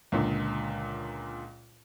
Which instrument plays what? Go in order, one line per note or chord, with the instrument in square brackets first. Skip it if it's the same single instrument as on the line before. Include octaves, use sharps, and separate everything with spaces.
[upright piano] C#2 A#2 D3